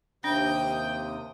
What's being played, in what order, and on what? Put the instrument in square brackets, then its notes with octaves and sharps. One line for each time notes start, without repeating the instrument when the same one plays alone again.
[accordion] D#2 C3 D#6 [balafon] D4 [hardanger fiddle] G5